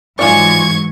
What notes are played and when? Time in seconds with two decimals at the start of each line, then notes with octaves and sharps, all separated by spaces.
0.19 G#2 E3 F#3 G#3 F4 D5 C#6 G#6